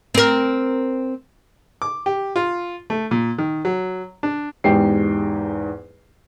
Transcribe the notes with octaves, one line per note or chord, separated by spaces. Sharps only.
C4 A#4
D6
G4
F4
A3
A#2
D#3
F#3
D4
E2 G#2 G4 G5 C7